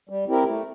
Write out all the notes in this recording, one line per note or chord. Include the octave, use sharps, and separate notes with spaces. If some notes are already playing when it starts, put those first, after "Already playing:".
G3
C4 E4 G4 A#4
A3